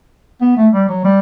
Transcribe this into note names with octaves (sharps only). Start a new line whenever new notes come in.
B3
A3
G3
F#3
G3